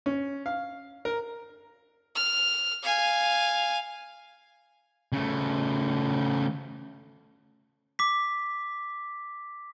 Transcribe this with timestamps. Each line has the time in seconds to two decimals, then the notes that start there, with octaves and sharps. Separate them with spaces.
0.06 C#4
0.46 F5
1.05 A#4
2.15 F6
2.83 F5 G#5
5.12 C#3 A3
7.99 D6 B6